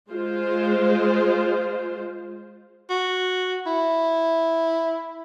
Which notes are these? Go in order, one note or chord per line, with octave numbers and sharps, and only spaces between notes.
G#3 F4 C5
F#4
E4